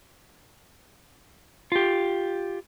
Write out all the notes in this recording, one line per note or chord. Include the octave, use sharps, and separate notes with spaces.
F4 G4